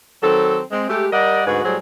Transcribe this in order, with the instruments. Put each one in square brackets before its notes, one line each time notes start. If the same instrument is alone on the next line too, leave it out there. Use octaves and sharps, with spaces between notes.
[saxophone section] D#3 F#3 C4 A4
G#3 C4
G#3 A3 G4
G3 A#4 D5 D#5 F#5
D2 G#2 F#4 G#4 B4
A2 F#3 G3 G#4 C5